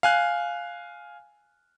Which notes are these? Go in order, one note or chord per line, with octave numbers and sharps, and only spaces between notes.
F5 G#5 F#6